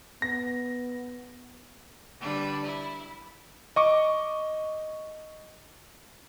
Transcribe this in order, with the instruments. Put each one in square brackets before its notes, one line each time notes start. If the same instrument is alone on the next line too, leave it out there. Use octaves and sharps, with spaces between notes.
[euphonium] B3 [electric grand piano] A#6
[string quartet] D3 G3 D4 B4
E4
[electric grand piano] D#5 C#6 D6